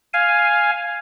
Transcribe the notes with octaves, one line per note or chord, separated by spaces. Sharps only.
F5 G#5